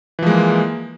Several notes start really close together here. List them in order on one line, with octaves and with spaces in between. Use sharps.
E3 F3 G#3 A#3